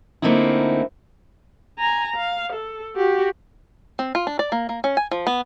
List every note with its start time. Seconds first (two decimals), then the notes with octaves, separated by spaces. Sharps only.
0.22 D3 A3 A#3 C4 D#4 E4
1.79 G#5 A#5
2.16 F5
2.53 A4
2.96 F#4 G4
3.99 C4
4.15 F4
4.27 D4
4.39 D5
4.52 A#3
4.69 A#3
4.84 C#4
4.97 G#5
5.11 F3
5.27 B3